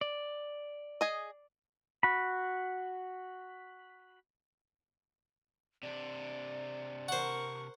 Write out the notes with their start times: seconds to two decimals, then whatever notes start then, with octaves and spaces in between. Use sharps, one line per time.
0.01 D5
1.01 G#4 D#5
2.03 F#4 B5
5.83 C3 D4 D5
7.09 A#4 C5 F#5 C#6